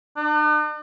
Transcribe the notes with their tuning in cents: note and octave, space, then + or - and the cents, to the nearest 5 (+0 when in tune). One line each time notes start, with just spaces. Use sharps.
D4 +45